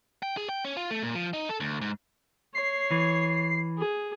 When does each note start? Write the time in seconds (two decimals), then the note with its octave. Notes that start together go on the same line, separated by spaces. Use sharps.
0.23 G5
0.37 G#4
0.49 G5
0.65 C#4
0.77 F4
0.91 A3
1.03 A#2
1.15 F3
1.33 D#4
1.49 A4
1.60 D2
1.81 G#2
2.55 C#5 C7
2.91 E3
3.79 G#4